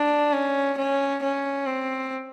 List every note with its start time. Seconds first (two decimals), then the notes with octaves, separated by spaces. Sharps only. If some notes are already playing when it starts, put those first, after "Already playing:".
Already playing: D4
0.33 C#4
0.78 C#4
1.23 C#4
1.66 C4